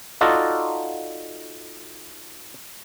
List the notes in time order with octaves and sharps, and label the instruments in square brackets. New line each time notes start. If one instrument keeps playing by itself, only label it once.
[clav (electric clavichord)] D#4 F4 F#4 A4 D5 D#5